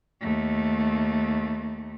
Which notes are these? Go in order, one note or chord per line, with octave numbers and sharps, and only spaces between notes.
D#2 A3